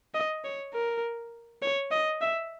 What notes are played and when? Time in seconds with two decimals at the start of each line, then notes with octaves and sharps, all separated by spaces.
0.14 D#5
0.45 C#5
0.74 A#4
1.62 C#5
1.91 D#5
2.21 E5